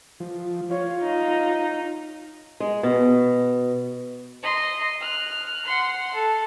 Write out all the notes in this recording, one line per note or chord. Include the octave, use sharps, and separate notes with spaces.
F3
F4 C#5
D#4
G#3
B2
D#5 C6
F6 F#6
F#5 C6
A4